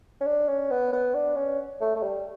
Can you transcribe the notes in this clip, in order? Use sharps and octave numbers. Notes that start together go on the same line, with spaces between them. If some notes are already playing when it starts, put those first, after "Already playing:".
C#4
D4
C#4
B3
B3
D4
C#4
A3
A3
G3